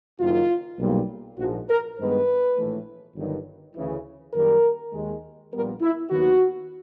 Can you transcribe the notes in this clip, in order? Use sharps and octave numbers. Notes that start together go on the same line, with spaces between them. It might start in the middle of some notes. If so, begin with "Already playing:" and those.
F#1 F#2 D#3 F4
B1 A#2 G3 A#3
A#1 G#2 F3 F#4
A#4
G2 D#3 G#3 B3 B4
A#1 A2 E3 A3
G1 G2 D#3 F#3
D2 C#3 E3
F#2 D#3 G3 A#3 A#4
D#2 D#3 G#3
A#1 A#2 G3 B3 A#4
E4
D#2 D#3 F#3 B3 F#4